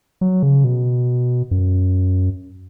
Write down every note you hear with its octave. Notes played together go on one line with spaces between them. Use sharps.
F#3
C#3
B2
F#2